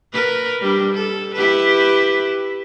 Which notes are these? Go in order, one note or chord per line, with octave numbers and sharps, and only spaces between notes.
A#4 B4
G3 D4
A4
E4 G4 B4